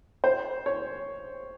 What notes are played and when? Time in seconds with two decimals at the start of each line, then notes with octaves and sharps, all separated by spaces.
0.24 C5
0.66 C#5